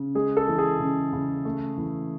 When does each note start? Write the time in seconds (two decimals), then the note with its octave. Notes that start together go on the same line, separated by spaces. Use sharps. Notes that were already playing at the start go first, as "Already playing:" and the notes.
Already playing: C#3
0.15 G#3 G#4
0.37 A4
0.48 E3
0.58 G#4
0.80 C#3
1.13 C#3
1.45 A3
1.78 E3